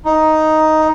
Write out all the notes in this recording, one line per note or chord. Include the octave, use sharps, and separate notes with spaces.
D#4